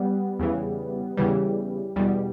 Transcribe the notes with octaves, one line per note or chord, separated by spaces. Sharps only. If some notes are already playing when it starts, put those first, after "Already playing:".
Already playing: G3 B3
E2 C#3 E3
E2 C#3 E3 G3
E2 B2 G3